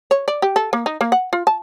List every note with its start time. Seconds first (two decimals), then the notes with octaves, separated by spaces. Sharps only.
0.11 C#5
0.28 D5
0.42 G4
0.56 A4
0.73 A#3
0.86 D#4
1.01 A#3
1.12 F#5
1.33 F4
1.47 A5